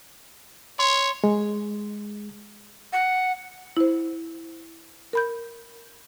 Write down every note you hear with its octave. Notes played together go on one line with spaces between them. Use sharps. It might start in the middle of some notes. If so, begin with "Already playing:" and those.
C#5 C6
G#3
F#5
E4 C5
A#4 B5 G6